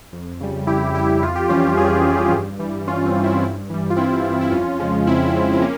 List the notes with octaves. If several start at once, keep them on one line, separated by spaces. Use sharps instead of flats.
F2
C#3 G3
F2 E4 G4
C#3 G3 E4 G4
F2 F4
G4
E3 G3 C#4 F4
F2 F4 G#4
E3 G3
G2
E3 G3
G2 C#4 F4
C4
E3 G3
C4 E4
G2
E3 G3
F4
G2 C4 E4
E3 G3
E4
F2 C#4 F4
C#3 F3 G#3
F2 C4 E4
C#3 F3 G#3
C4
A#3 C#4